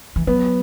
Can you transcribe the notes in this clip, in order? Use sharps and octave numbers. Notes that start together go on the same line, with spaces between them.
E3
F#3 B3